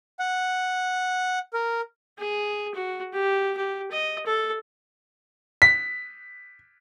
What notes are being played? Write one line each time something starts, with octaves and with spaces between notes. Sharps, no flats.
F#5
A#4
G#4
F#4
G4
G4
D#5
A4
B6